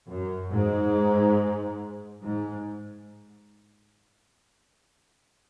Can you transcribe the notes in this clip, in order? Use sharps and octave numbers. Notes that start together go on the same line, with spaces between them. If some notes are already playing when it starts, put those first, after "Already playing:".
F#2
G#2
G#2